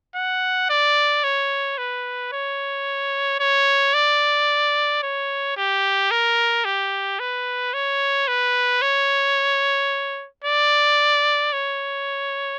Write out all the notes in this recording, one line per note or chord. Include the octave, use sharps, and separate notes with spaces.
F#5
D5
C#5
B4
C#5
C#5
D5
C#5
G4
A#4
G4
B4
C#5
B4
C#5
D5
C#5